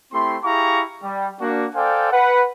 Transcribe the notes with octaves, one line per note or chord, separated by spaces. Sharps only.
A3 C4 E4 G4 C6
E4 G4 G#4 F5 A#5 C#6
G3
A#3 D4 F#4
A4 C5 D5 F5 G5 G#5
B4 F#5